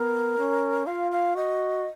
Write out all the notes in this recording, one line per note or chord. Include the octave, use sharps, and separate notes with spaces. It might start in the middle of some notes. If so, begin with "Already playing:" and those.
Already playing: B3 A#4
C#4
F4 F5
F5
F#4 D#5